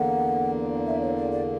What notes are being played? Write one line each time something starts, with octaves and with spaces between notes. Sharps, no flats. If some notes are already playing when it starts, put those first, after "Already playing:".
Already playing: E2 D3 A#3 F#5
E5
C#5
D5
D5